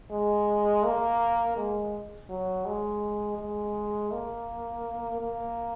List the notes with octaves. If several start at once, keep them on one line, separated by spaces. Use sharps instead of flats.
G#3
A#3
G#3
F#3
G#3
G#3
A#3
A#3